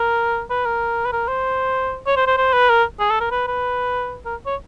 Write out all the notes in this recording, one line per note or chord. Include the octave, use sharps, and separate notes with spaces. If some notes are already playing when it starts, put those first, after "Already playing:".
Already playing: A#4
B4
A#4
B4
A#4
C5
C#5
C5
C5
C5
B4
A#4
G#4
A4
A#4
B4
B4
A#4
C#5